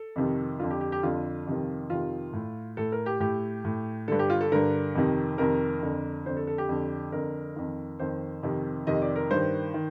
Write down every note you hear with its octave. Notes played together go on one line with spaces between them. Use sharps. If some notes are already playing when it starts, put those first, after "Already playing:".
Already playing: A4
F2 C3 D#3
F2 D3 F4
G4
G4
G4
F2 D3 F4
F2 C3 D#3
F2 C3 D#3 F4
A2
A2 A4
A#4
G4
A2 G4
A2
G2 D3 A4
G4
F4
A4
G2 D3 A#4
F2 C3 D#3
F2 C3 D#3 A#4
F2 D3
F2 D3 C5
A4
A4
G4
F2 D3
F2 D3 A#4
F2 D#3
F2 D#3 C5
F2 C3 D#3
F2 C3 D#3 D#5
D5
A#4
G2 D#3 C5
D#3